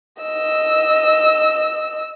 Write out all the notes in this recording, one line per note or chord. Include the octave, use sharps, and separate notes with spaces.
D#5 E6